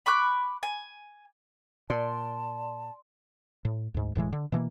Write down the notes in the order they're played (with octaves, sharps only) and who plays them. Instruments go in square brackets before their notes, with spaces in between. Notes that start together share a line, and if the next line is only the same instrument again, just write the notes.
[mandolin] B5 C#6 D6 F#6
G#5
[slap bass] A#2 [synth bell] D5 C6 [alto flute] A5
[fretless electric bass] A2
D2 G#2
E1 A2 E3 G#3
D3
B2 E3 G#3 A#3